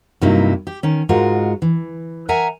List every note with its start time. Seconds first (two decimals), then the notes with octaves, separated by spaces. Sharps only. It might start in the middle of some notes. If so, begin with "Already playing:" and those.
0.21 G2 C3 F#3 A#3 D#4 E4
0.67 G4
0.83 D#3 C#4
1.09 G#2 G#3 F4 F#4 A#4
1.62 E3
2.29 A#4 E5 F#5 G#5 A#5